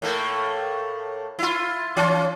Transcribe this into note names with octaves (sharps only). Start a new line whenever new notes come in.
A2 A3 A#3
E4 F4
E3 C#4 F4